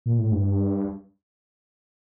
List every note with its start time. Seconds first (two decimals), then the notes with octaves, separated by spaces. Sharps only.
0.06 A#2
0.18 A2
0.32 G2